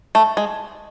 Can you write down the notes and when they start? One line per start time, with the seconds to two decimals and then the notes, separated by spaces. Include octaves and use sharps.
0.15 A3
0.37 G#3